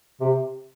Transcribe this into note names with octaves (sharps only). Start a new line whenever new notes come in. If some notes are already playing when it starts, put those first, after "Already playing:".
C3